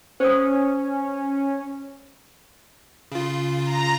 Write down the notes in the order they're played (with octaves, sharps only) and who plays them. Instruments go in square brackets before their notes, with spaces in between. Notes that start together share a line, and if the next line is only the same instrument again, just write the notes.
[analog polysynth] C#4 [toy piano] C5 D#6
[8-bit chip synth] C#3 F4
[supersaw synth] A#5